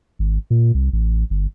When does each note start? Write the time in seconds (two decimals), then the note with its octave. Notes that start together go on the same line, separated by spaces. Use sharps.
0.19 G#1
0.50 A#2
0.74 C2
0.93 A1
1.30 G1